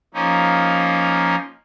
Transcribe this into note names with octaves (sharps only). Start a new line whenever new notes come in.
F3 A#3 C#4 D#4